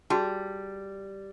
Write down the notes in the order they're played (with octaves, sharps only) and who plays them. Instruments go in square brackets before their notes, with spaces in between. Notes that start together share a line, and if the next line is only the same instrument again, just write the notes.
[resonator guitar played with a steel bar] G3 [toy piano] F#4 G#4 A5